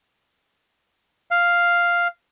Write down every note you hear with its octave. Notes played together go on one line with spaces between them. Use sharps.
F5